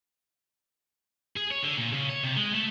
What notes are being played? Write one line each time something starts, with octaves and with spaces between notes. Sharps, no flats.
G#4
C#5
D3
A#2
C#3
C#5
C3
G#3
A3